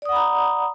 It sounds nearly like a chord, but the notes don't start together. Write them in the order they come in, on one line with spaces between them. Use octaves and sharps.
D5 D#6 F#5 B5 A#5